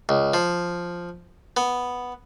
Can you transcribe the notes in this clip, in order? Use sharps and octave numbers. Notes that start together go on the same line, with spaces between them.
C#2
F3
B3